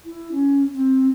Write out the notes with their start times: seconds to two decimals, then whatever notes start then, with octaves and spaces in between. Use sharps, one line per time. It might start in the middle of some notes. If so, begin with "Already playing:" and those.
0.05 E4
0.31 C#4
0.73 C4